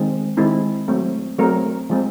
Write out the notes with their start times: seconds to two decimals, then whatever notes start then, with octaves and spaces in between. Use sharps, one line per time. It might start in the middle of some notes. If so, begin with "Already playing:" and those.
Already playing: D#3 G#3 C4
0.37 D#3 G#3 C4 E4
0.88 F#3 A3 C4
1.39 F#3 A3 C4 A#4
1.90 F3 G#3 C4